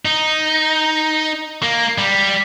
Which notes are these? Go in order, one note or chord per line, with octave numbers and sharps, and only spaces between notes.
D#4
A#3
G3